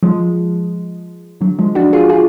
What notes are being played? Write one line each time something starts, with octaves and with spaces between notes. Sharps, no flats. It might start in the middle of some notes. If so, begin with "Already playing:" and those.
F3 G#3
D3 F#3
F3 G#3
D4 F#4
F4 G#4
F4 G#4